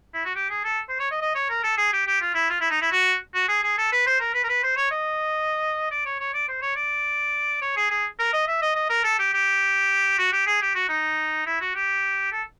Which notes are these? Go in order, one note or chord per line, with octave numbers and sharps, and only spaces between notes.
E4
F#4
G4
G#4
A4
C5
C#5
D#5
D#5
C#5
A#4
A4
G#4
G4
G4
F4
E4
F4
E4
D#4
E4
F#4
F#4
G#4
G#4
A4
B4
C5
A#4
B4
A#4
B4
C5
C#5
D#5
D5
C#5
C#5
D5
C5
C#5
D5
C#5
G#4
G#4
A#4
D#5
E5
D#5
D#5
A#4
A4
G4
G4
F#4
G4
G#4
G4
F#4
D#4
E4
F#4
G4
A4